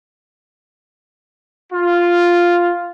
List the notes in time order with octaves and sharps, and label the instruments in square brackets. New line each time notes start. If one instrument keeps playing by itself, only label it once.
[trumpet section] F4